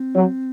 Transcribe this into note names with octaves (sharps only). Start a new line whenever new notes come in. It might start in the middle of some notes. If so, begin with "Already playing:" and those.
Already playing: C4
F#3